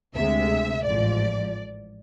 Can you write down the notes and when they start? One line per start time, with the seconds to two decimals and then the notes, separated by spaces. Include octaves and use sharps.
0.13 D2 C3 G#3 E5
0.84 A1 G#2 F3 D5